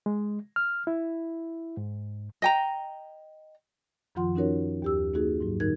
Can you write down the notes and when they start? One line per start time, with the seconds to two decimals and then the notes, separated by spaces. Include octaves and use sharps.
0.06 G#3
0.56 F6
0.87 E4
1.77 G#2
2.42 D#5 G5 A#5
4.15 F#2 D#3 F3 F4 F#5 C6
4.35 C#4 D#4 F#4 A#4 C#5
4.82 D#2 G4 E6
5.14 A#3 D#4 F#4 G#4
5.41 G#2 F#3
5.60 F#2 D3 D#4 A#4 G#6